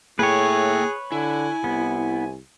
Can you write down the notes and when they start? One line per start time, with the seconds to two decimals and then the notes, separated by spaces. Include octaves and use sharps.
0.19 A2 A#3 G#4 B4 C#5 G5
1.12 D3 E4 G#5
1.64 C2 B3